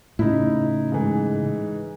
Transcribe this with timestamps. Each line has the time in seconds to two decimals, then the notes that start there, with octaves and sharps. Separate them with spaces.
0.19 A2 C#3 D#4 E4
0.92 G#2 E3